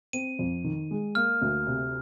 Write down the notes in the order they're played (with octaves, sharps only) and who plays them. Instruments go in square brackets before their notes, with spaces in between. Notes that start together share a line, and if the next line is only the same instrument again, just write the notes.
[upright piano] C4 [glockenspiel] D#7
[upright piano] F2
D#3
G#3
[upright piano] A#3 [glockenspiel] F6
[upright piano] D2
C3